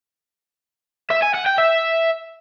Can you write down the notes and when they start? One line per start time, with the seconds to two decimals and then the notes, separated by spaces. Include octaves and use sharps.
1.11 E5
1.23 G#5
1.34 F#5
1.46 G5
1.58 E5